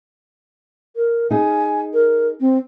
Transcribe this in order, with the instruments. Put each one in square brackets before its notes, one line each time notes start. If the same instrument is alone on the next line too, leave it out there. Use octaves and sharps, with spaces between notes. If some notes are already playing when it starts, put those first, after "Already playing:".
[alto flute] A#4
[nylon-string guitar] D#4 G#4 [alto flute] G#5
[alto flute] A#4
C4